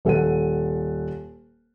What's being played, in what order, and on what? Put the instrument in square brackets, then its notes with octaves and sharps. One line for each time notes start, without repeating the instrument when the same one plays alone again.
[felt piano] D#1 A4 F#5 D#7